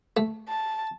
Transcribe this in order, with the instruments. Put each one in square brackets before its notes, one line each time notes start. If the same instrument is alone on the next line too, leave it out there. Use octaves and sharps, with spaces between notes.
[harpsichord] A3
[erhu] A5